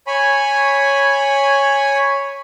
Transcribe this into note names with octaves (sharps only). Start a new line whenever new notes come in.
C#5 G#5 B5